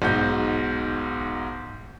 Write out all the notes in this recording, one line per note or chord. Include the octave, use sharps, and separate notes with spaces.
B1 G#2 F#4 G6